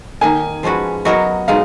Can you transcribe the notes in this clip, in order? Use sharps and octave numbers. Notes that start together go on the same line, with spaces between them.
D#3 A#3 D#4 G#5
F3 G#3 C#4 F#4 B4
F#3 B3 F#4 A#4 C#5 D#5
B2 G#3 D#4 F5